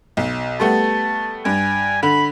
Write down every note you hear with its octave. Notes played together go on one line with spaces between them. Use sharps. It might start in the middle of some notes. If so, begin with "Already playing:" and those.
B1
G3 A3 B3 A5
G2 G#5
D3 B5